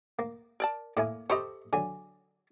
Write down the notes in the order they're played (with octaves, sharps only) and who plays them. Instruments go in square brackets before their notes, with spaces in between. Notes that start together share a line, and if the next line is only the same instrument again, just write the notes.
[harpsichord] A#3
[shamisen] A#4 D5 A5
[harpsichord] A2 E4 G#5 [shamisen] A#3
[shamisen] G4 A4 C5 [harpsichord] D#5 B5 C#6
[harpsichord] D3 F#3 [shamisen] G#5